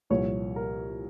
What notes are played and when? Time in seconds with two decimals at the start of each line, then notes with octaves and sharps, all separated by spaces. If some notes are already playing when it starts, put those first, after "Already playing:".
0.10 C2 A#2 F3 C#5
0.56 A#4